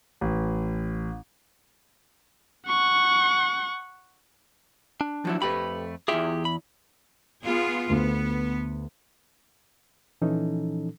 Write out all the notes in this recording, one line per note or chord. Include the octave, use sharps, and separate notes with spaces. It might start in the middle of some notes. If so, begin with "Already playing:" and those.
A1
F#5 C#6
D4
F3 F#3 E4
F2 A3 G4 B4 B5
E2 E4 F4 G4 G#4 E5
B5
B3 F4 G#4
D2 B3
A#2 E3 F3 C#4 D#4 A4